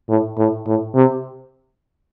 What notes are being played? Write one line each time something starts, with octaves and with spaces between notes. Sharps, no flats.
A2
A2
A2
C3